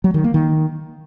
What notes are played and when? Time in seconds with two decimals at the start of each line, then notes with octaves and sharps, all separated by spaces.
0.04 F#3
0.14 D#3
0.24 A#3
0.34 D#3